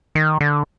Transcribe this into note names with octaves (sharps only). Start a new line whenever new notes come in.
D#3
D3